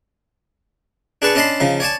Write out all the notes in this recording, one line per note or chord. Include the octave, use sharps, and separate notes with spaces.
D4 G#4 B4 A5 C#6
C#4 D4 D#5 A5 B5 C6
C#3 F3 D#4
C#5 D5 G#5 A5